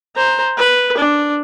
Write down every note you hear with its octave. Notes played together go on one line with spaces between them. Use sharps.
C5 A#5
B4
D4